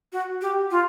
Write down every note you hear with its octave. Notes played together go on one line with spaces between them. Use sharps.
F#4
G4
F4